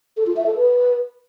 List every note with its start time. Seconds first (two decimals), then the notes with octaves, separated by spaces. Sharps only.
0.17 A4
0.27 F4
0.36 E5
0.46 A4
0.56 B4